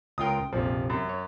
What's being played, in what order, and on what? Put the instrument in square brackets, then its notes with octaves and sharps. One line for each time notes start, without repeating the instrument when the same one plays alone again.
[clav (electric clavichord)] C#2 F4 A#4 [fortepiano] G5 D#6
[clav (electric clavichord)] A#1 F2 C3 [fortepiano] F3
[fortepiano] F#2
[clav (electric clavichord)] C#5